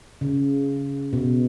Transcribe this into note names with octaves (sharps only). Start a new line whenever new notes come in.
C#3
B2